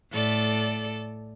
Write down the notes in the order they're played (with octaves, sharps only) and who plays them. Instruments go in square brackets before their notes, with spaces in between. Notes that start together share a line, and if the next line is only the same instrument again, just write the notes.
[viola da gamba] A2 A4 D5